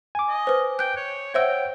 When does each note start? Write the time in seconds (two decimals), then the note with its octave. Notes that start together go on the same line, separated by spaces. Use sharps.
0.15 G#5 D6
0.28 D#5
0.47 B4 C5
0.79 G5 F#6 G6
0.96 C#5
1.34 C5 C#5 E5 F#5 G5 E6